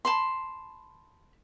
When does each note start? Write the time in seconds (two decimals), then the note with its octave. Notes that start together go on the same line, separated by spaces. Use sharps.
0.05 A5 B5 C6